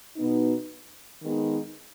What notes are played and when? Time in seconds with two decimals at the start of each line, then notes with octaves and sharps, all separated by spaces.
0.17 B2 B3 D#4
1.22 D#3 G#3 B3 D#4